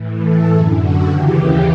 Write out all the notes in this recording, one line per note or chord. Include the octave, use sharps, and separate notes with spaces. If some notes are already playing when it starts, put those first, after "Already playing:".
Already playing: A2 E3
A4
F#2 D3 G#4
F#4
D#2 C#3 E3 G4